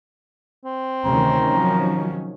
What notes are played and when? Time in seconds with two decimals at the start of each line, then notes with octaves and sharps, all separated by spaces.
0.65 C4
1.06 D2 C3 D#3 C#4 A#5
1.54 F3 F#3